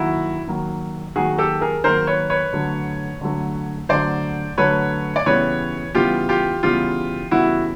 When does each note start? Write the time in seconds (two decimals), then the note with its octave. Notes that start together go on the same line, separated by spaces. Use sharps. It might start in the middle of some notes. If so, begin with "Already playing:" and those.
Already playing: D#3 F#3 A#3 E4 F#4
0.47 D#3 F#3 A#3
1.16 D#3 F#3 A#3 F#4 G#4
1.38 G4 A4
1.61 G#4 A#4
1.84 D#3 F#3 A#3 A#4 C5
2.07 B4 C#5
2.30 B4 C#5
2.53 D3 F#3 A3
3.21 D3 F#3 A3
3.89 D3 F#3 A3 C5 D5
4.58 D3 F#3 A3 B4 C#5
5.16 D5
5.26 C#3 E3 G3 B3 B4 C#5
5.95 C#3 E3 G3 B3 F4 G4
6.29 F4 G4
6.63 C#3 E3 G3 B3 F4 G4
7.31 C#3 E3 G3 B3 E4 F#4